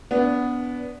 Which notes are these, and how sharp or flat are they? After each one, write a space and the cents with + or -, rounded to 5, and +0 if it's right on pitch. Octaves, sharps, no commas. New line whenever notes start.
B3 +0 D4 -25